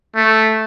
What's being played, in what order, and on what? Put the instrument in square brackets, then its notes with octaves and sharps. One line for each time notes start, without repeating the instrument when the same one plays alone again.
[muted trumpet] A3